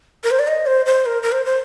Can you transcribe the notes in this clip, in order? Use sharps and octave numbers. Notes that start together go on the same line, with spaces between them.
A#4
C5
D5
D#5
C5
C5
A#4
A#4
C5
C5